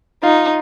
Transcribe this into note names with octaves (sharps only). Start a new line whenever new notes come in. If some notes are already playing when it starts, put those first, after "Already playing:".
D#4 F4